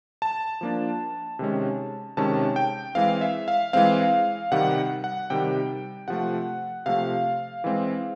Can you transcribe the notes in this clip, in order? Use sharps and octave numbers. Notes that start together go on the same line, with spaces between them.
A5
F3 A#3 D4
C3 D#3 G#3 C#4
C3 D#3 G#3 C#4 A5
G5
E3 G#3 C4 F5
E5
F5
E3 G#3 C4 F5
C3 D#3 G3 F#5
F#5
C3 D#3 G3 G5
C3 F3 A3 F#5
C3 F3 A3 F5
E3 G#3 C4